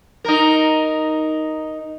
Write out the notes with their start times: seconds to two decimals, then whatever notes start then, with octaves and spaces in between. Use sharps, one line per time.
0.24 D#4 A#4